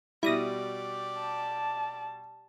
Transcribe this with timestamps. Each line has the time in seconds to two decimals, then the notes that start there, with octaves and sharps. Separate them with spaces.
0.23 B2 G3 E4 G4 D5 D#6 A#6
1.20 A5